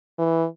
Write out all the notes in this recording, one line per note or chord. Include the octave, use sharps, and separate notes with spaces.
E3